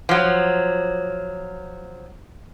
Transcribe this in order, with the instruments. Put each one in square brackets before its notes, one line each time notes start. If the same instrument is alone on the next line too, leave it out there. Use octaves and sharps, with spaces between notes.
[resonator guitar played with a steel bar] F3 F#3